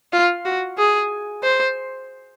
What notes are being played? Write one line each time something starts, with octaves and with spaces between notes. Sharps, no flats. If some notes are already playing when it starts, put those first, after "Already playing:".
F4
F#4
G#4
C5